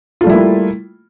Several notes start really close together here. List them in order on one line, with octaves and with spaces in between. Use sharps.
F4 A3 G3 E4 A#3